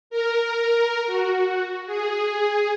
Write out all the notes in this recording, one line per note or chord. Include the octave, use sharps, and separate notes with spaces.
A#4
F#4
G#4